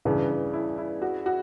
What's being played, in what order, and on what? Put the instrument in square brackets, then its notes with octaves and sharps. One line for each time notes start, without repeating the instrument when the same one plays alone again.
[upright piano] G2 [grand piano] C#3 E3
[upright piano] G2
E4
E4
F#4
F#4